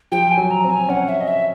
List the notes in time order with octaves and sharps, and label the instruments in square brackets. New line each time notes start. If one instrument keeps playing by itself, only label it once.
[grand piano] F3 [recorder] G5
[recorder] G#5
[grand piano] F#3
[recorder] A#5
[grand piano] C4
[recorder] G#5
[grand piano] C#4 [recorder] F#5
[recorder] E5
D#5
E5